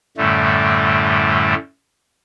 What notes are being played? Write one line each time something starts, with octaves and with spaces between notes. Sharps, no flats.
F#2 A2 D3 G3 A3